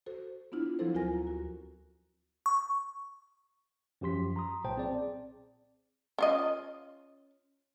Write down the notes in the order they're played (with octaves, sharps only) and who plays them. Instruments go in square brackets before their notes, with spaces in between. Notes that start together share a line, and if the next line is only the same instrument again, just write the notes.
[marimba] F#4 A4 C5
B3 D4 E4 F4
F3 F#3 C4 E4 A4 C5
D2 F4 A#4 G#5 A#6
A#5
F#4
[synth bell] C#6
[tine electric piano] F#2 F3 G4 C6 B6
A#5 C6 D#6
B1 A#2 C5 G5 A5
C4 G#4 D5
[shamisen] C#4 F4 D#5